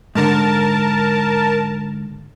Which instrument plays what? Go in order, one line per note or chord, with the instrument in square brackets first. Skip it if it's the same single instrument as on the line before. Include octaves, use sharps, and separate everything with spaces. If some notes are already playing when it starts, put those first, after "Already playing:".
[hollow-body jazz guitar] G#2 D3 [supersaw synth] A#4 A5